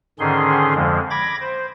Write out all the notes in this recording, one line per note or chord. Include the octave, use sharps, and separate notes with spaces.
G#2 D3 D#3 C#4 G#4 C6
F2 D3 F3 G#3
B5 D6 G#6 A#6
C5